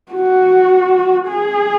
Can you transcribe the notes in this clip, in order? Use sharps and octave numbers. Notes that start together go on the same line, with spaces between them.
F#4
G#4